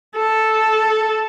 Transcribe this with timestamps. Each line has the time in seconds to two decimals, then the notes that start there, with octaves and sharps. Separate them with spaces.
0.17 A4